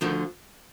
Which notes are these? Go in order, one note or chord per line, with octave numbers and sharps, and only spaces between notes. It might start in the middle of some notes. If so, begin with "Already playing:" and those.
D2 D3 D#3 F3 D#4